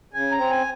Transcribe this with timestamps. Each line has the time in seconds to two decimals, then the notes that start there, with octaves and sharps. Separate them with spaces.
0.13 C#3 G#5
0.32 A#5
0.37 C4
0.51 G#5